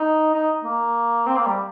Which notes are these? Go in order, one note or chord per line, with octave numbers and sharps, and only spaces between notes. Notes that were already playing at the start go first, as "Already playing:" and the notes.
Already playing: D#4
D#4
A#3
C4
A#3
G3